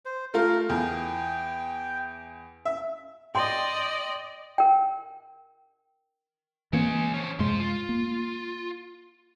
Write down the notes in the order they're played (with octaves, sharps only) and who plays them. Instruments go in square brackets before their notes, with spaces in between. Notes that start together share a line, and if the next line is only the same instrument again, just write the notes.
[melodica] C5
[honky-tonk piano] A3 F4 [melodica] A#4
[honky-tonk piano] E2 [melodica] G5
[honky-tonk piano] E5
[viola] D5 D#5 [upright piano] G5 C6
[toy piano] A#4 G5
[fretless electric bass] E3 A#3 C4 [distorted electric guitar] G#3 C#5
[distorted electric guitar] F3 C#4
[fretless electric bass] F#2 C3 G#3 [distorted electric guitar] F3 C6
[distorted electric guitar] F4
[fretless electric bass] A#3